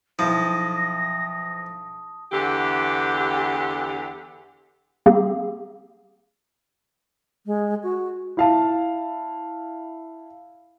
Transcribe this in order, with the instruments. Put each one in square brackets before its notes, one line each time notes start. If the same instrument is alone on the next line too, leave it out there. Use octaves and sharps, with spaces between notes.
[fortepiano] B1 E4 [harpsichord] F3 [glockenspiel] A5 D#6 [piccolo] A#6
[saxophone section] E2 D3 G4
[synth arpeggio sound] G3 A#3 C4 G4 G#4 F5
[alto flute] G#3
F#4
[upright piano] E4 F5 A5